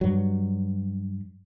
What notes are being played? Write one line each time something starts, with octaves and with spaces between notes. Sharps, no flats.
G2 F#3